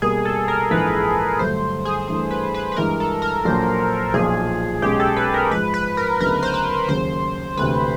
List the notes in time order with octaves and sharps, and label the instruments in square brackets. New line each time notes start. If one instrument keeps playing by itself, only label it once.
[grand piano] B2 G3 A#3 [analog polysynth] G#4
[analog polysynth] A4
A#4
[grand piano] A#1 G#2 E3 [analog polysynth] B4
[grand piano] G2 D3 F#3 A3 [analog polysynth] C5
[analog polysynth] G#4
[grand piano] G2 E3 A3 [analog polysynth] G#4
[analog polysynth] B4
B4
B4
[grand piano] G2 E3 G#3 [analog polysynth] A#4
[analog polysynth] A4
A#4
[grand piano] A#1 A#2 F#3 [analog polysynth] C5
[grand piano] B1 A#2 F3 [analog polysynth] G#4
[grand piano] B1 B2 G#3 C#4 [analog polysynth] G4
[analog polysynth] A4
B4
A#4
[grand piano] G#2 F3 G#3 [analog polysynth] B4
[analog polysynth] B4
A#4
[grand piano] D2 C#3 F#3 B3 D#4 [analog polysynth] A#4
[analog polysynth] C5
B4
[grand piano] D#2 C#3 F#3 A#3 [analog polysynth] C5
[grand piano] E1 D2 C3 [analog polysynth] B4